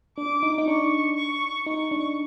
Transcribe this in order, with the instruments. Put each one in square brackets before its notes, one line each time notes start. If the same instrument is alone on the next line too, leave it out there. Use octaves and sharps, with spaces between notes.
[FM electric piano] D4 [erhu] D6
[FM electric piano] D#4
D#4
[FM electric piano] D4 [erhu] C#6
[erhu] C#6
[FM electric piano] D#4 [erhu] C#6
[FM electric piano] D4